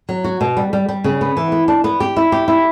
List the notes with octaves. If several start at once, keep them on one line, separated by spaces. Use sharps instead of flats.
F#3
F#4
B2
G3
G3
G3
C#3
B3
E3
B3
D4
B3
G4
E4
G4
E4